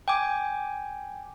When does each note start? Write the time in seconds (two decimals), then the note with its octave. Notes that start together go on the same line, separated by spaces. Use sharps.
0.08 G5 G#5 D6